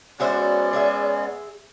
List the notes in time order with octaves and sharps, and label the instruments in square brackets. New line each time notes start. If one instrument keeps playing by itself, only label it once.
[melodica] G#3 B3 C#4 [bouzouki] F#4 C5 E5 [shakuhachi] D5
[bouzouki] G#4 E5